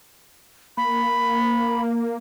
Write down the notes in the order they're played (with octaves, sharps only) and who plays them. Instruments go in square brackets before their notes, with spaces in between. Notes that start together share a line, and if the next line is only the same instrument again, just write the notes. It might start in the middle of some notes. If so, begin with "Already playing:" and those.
[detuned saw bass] A#3 [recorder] B5